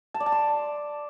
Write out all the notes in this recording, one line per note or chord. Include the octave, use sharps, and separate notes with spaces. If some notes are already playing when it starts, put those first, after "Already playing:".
A5
D5
A5
C6